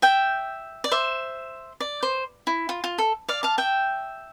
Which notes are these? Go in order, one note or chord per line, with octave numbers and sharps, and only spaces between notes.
E5 G5
D5
C5 E5
D5
C5
E4
F4
F4
A4
D5 F5
F5 A5
E5 G5